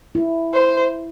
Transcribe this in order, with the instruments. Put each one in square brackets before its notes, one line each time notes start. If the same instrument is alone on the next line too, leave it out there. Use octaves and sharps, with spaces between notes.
[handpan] E4
[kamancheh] C5